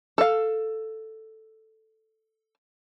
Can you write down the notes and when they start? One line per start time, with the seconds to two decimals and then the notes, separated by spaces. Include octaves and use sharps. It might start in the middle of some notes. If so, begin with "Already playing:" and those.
0.18 A4 F5